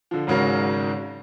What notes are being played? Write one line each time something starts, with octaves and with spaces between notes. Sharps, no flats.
D3 F3
G#1 G#2 C#3 F#3 A#4